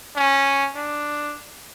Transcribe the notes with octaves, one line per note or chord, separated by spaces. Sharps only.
C#4
D4